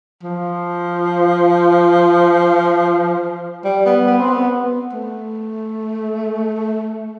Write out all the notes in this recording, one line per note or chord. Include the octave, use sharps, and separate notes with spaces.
F3
G3
B3
B3
C4
B3
A3